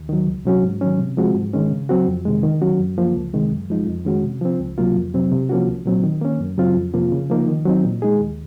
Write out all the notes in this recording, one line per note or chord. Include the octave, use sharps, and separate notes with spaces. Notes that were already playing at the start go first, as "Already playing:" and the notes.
Already playing: D#2
D#3 F#3
C#2
C3 F#3 C#4 F#4
G#2
D#3 F#3 C#4
C3
F3 G#3 C4 F#4
G#2
D#3 G#3 C#4
C#3
F#3 C4 F#4
F2
C3 D#3 G#3
D#3
F#3 C#4 F#4
F#2
F3 A#3
C#2
C3 D#3 G#3
F#2
F3 G#3 D#4
F2
D#3 G#3 C#4 F#4
C3
F3 C4
C#2
C3 F#3 A#3 F4
F2
C3 F#3 C4
C3
F3 A#3 C#4 F#4
C2
A#2 F#3 C4
D#3
A#3 C#4
F#2
C#3 F#3 C4 F4
F2
C3 F3 A#3 F4
C#3
F3 A#3 D#4
D#3
F#3 C4 D#4
A#2
G#3 D#4 G#4
D#2